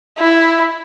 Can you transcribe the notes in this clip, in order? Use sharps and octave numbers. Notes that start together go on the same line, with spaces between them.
E4